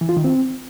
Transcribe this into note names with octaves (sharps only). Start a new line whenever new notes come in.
E3
F4
D#3
C4